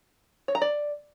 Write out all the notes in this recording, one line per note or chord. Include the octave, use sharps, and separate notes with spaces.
C#5
A#5
D5